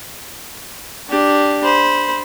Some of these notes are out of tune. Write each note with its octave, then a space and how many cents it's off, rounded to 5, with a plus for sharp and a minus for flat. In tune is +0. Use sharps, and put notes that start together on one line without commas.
D4 +0 G4 +0
C5 -5 B5 -15